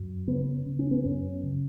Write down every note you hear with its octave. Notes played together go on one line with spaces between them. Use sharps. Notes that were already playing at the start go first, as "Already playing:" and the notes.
Already playing: F#2
C#3 B3
C#3
C#4
B3
F#2 C#4
C#3